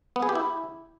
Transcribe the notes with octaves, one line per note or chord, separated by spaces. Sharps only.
B3
G#4
G4
E4